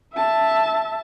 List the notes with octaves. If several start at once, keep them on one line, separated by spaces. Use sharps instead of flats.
E5 A5